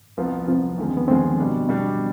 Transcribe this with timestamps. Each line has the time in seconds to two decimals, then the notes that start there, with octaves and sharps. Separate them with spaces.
0.17 C2 C3 F3 B3 F4
0.48 C2 C3 F3 B3 C4 F4
0.78 D#2 D3 F3 G#3
0.97 B3
1.08 D#2 D3 F3 G#3 C4
1.38 B2 G3 D4
1.68 B2 G3 D4